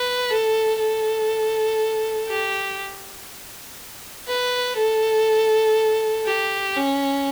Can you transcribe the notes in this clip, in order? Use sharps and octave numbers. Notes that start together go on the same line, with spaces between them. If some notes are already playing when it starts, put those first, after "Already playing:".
Already playing: B4
A4
A4
G4
B4
A4
G4
C#4